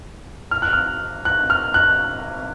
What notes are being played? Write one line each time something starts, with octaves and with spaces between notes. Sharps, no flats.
F6
F#6
F6
F#6
F6
F#6